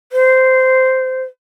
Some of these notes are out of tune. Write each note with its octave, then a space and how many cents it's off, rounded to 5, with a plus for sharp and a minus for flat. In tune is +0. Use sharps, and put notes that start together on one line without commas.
C5 -10